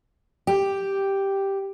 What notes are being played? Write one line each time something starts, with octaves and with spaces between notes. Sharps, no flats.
G4